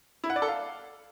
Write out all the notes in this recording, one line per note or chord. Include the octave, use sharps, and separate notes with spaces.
E4
F#5
D5
A4
F5